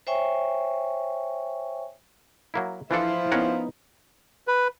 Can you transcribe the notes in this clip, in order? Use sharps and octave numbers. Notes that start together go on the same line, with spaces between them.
C5 C#5 E5 G5 G#5 C#6
F#3 A#3 E4
E3 F3 D4 E4 A4
B3 C#4 D#4 A#4 F#5
B4